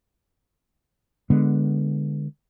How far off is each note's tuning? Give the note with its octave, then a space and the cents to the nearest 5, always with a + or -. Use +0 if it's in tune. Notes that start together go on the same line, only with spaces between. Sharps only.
D3 +0 G#3 -15 B3 +0